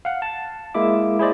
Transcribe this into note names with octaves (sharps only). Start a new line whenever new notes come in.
F5 F#5
A5
G#3 A#3 E4 E5 D6
E4 G#4 C5 D5 D#5